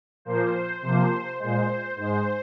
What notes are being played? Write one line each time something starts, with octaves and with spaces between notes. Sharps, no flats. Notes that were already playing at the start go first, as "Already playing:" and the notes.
A#2 F3 A#3 C5
C3 F3 A#3 C5
A#2 G#3 C5
G#2 G#3 C5